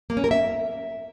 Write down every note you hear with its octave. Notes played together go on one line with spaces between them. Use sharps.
A#3
C#4
A#4
E5